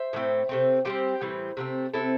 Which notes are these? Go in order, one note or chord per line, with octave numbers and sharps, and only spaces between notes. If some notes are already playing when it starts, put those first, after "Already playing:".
Already playing: C5 E5
A2 E3 A3 C4
C3 A3 C4
D3 G3 C4 G4 C5
A2 E3 G3 C4
C3 E3 A3 C4
C3 E3 C4 E4 A4